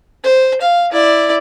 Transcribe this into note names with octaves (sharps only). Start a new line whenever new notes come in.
C5
F5
E4 D5